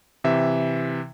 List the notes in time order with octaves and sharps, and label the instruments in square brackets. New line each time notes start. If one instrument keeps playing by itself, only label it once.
[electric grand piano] C3 E3 E5